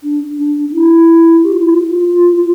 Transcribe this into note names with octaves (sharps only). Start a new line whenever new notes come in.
D4
D4
D4
E4
G4
F4
E4
F4
F4